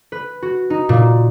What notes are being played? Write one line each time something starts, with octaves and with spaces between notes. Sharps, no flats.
B4
F#4
D#4
A#2